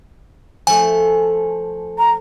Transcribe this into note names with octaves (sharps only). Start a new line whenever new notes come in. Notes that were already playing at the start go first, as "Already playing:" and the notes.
F3 A3 G#5
A#5